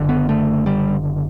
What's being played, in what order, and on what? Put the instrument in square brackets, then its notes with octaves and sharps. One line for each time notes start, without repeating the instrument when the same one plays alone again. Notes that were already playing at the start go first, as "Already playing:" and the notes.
Already playing: [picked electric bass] F#1 D3
B3
A3
G3